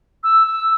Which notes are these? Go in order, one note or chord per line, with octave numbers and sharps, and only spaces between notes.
E6
E6